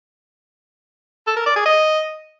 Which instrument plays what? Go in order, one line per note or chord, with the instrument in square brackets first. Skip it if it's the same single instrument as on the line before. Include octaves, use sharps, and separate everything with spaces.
[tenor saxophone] A4
A#4
D5
G#4
D#5